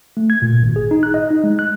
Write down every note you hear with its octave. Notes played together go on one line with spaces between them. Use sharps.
A3
G#6
A#2
G#1
G#4
D#4
F#6
D#5
D#4
G#3
F#6